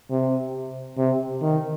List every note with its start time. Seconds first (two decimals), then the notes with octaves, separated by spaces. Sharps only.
0.10 C3
0.98 C3
1.42 D#3